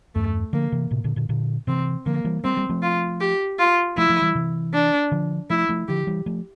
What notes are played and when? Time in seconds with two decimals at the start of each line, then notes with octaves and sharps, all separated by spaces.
0.15 E2 G2 A3
0.53 D3 F3 A#3
0.72 C3 E3
0.91 A2 C3
1.04 A#2 D3
1.16 A#2 D3
1.29 A#2 D3
1.67 C3 E3 C4
2.06 D3 F3 A#3
2.24 E3 G3
2.44 G3 A#3 C4
2.57 G3 A#3
2.69 F3 A3
2.82 F4
3.21 G4
3.59 F4
3.97 F3 A3 E4
4.09 F3 A3
4.22 E3 G3
4.35 C3 E3
4.74 D4
5.11 D3 F3
5.50 F3 A3 E4
5.69 F3 A3
5.88 D3 F3 G4
6.07 E3 G3
6.26 F3 A3